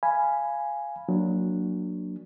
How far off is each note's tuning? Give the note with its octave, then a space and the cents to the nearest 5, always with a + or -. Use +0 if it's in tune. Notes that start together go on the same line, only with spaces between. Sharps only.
F5 -10 G#5 +0 B5 -5
F#3 -15 A#3 +0 D4 +0